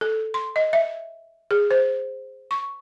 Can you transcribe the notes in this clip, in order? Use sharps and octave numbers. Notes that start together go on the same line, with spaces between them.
A4
C6
D#5
E5
G#4
C5
C#6